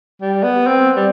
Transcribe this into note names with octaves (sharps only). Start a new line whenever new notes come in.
G3
B3
C4
G3